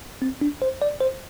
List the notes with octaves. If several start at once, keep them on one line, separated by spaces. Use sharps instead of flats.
C4
D4
C5
D5
C5